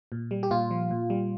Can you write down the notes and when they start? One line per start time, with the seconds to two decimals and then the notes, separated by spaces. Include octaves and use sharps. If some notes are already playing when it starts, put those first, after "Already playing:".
0.12 A#2
0.31 G3
0.43 G4
0.51 A#2 F4
0.71 F3
0.91 A#2
1.10 G3